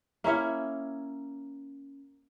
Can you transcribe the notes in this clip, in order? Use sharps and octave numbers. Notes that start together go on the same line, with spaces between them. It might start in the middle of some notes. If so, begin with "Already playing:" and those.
A#3 C#4 E4 C#5